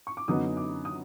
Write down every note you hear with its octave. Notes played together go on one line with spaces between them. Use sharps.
C#6
D6
F#2 D3 F#3 B3 D#4 D#6
D6
D#6